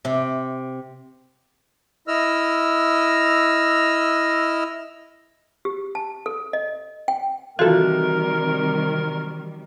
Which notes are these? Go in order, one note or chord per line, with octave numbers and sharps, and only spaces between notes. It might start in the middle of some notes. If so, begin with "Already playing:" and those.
C3
E4 D#5 E6 F6
G4
A5
A4
D#5
G5
C3 D#3 E3 G3 F4 F#4 A4 A#4